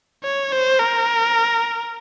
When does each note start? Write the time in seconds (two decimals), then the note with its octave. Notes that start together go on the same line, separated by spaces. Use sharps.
0.24 C#5
0.52 C5
0.80 A#4